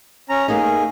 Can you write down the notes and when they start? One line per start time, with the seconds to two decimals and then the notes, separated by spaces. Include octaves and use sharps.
0.29 C#4 A#5
0.48 A3 A#3 D#4 G#4